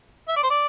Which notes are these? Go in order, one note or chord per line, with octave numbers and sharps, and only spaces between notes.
E5
D5
C5
D5